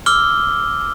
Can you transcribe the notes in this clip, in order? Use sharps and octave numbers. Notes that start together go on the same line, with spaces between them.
D6 E6 F6 G7